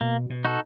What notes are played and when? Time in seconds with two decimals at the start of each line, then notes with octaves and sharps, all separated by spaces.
0.01 B2 A#3
0.30 B2
0.45 D#4 F#4 A4